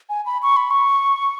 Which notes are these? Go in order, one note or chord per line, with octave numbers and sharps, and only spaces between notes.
G#5
B5
C#6
B5
C#6